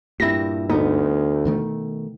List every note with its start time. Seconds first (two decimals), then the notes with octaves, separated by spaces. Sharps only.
0.20 G2 A#2 E4 G4 A#6
0.70 D2 B3 D#4
1.45 B2 D#3 A3